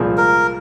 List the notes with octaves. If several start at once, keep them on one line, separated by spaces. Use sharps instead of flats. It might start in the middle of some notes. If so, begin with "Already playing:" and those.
Already playing: C2 A#2 F3 G#3
A#4